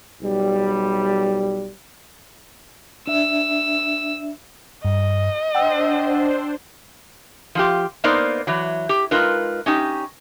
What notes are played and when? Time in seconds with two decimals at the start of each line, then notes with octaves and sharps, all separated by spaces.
0.22 B1 G3
3.07 D4 E5 E6
4.85 G2 D#5
5.55 D4 C5 F#5 G5 E6
7.55 F3 F4 G4
8.04 A#3 B3 D#4 A#4 C5 D5
8.47 E3 F#3
8.89 G4
9.11 G#3 D#4 F4 A#4 B4
9.66 C#4 D#4 G4